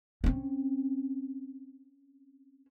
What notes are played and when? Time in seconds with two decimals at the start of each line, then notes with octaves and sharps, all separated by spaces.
0.24 C4 C#4